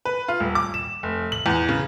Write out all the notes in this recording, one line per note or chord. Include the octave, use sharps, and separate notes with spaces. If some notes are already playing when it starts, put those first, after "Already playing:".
B4
F4
D#1
D6
E7
F1
F#7
E2
C#3